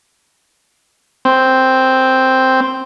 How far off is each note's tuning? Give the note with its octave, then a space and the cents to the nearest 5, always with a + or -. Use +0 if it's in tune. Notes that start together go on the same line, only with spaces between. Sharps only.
C4 +0